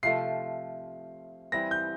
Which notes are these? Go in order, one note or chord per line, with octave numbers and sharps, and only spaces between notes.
C3 F3 A3 C7
E3 G3 C4 A#6
G6